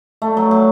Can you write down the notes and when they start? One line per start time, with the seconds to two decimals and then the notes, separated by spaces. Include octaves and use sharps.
0.22 A3
0.37 F#3
0.51 F#3